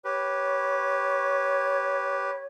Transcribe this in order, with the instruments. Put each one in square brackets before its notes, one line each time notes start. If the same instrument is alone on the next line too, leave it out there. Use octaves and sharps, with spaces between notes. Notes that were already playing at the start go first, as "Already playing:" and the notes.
[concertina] G4 B4 [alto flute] C#5